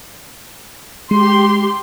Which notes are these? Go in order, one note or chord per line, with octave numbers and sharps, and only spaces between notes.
G#3 G4 C6